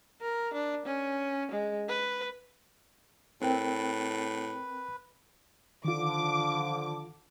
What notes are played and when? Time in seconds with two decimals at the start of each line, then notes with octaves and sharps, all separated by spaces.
0.21 A#4
0.54 D4
0.86 C#4
1.51 G#3
1.88 B4
3.42 A2 C4 A#4 B4 G5
5.85 D3 D#3 F3 F4 D6